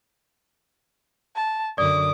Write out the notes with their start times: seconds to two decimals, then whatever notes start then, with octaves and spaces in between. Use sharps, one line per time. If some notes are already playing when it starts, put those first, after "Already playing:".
1.36 A5
1.78 F#2 D3 D5 D6 D#6